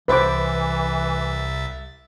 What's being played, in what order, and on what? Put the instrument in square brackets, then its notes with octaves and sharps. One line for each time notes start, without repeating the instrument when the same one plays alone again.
[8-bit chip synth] C2 E5 A6 [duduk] E3 [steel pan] B4 C5 D6